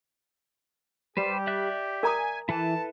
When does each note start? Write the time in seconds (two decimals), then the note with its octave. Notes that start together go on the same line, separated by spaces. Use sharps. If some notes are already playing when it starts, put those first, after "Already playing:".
1.17 G3 G4 B4 C5
1.47 D5 E5 F#6
2.03 A#4 G#5 A#5 D#6
2.49 E3 E4 A4 B4 A5